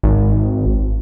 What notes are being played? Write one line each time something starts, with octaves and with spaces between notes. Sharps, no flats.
G#1